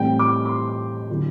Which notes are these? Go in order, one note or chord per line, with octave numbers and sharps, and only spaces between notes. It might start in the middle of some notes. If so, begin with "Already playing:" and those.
Already playing: A2 E3 G3 C4 E4 G5
D6
D6
C6
D3 F#3 B3 E4